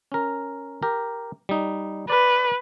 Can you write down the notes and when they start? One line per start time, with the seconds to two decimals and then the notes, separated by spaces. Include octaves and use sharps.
0.12 C#4 A#4
0.83 G4 A#4
1.49 G3 D#4
2.10 B4 D5